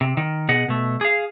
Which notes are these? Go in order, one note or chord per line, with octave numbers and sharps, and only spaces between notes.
C3
D#3
B2 G#4 D#5 F#5
B2 A3
G#4 F5